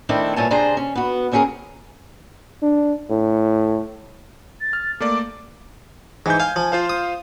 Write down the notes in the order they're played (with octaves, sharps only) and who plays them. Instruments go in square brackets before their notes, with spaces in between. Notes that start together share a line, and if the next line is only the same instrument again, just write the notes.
[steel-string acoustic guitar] D#3 A3 C4 D4 E4
G2 A#2 E4 C#5 G#5 A5
C3 D4 G#4 C5 A#5
C#4
B3 F#4
D3 C4 C#4 F4 G#4 A#4
[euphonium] D4
A2
[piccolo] A6
[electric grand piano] F6
[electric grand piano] A3 A#3 D5 [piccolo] D6
[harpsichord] G#2 [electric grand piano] E3 E4 G6
[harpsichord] F5 [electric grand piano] G#5
[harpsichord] F3
[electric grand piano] F4 C5 F5
[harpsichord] D#6